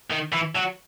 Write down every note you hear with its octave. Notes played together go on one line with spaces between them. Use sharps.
D#3
E3
F#3